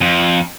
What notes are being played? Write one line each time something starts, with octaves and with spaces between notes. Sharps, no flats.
F2